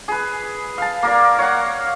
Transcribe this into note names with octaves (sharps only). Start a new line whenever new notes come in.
G#4 B4
F5 A5
A#3 A#4 D5
C#5 F5 F#5